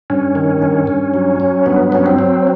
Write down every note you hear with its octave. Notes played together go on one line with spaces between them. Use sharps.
G2 C#4
D#3
G2
G2
F#3
F#3
G2 B3
F#3 C#4
C4
F#3